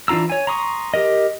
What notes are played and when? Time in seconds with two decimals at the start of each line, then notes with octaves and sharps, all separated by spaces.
0.08 E3 D4 F4 A#5 E6
0.30 C#5 G#5
0.47 A#5 C6 C#6 D#6
0.94 G4 A#4 D#5